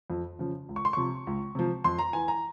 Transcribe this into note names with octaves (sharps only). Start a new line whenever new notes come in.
F2
C#3 F3
C#2
C#6
C6
C3 F3 C#6
C#2
C3 F3
F2 C6
A#5
E3 G#5
A#5